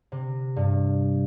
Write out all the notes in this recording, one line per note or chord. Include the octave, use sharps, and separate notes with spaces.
C3
G2